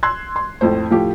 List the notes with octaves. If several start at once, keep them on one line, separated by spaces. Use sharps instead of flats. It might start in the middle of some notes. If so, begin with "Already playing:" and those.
C6 E6 F#6 G#6
C6
F2 A2 C5
A2 F3 G4